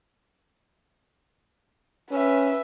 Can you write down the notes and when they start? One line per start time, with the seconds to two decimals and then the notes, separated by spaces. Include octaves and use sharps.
2.11 C#4 B4 E5